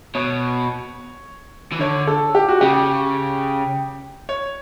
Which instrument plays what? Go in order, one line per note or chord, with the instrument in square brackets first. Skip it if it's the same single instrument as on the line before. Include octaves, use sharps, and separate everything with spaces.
[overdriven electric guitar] B2 [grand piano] C#5
[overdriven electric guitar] E3
[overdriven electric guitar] D3 [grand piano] C#5
[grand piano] A4
G4
F#4
[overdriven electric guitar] C#3 [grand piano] G4
[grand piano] C#5